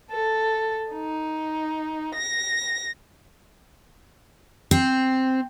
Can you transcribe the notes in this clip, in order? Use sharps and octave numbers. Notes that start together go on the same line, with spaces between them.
A4
D#4
A#6
C4